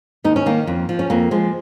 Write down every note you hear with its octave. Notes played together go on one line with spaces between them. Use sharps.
D#2 D#4
C#4
D#3 A#3
F2
F3
C#4
F2 A#3
F3 G#3